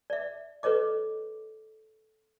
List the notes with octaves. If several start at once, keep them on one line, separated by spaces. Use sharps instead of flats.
D5 E5
A4 B4 C#5 D#5 D6